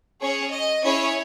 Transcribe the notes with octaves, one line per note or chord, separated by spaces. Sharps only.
C#4 G#4 C#5
D#5
C#4 E4 G#4 C#5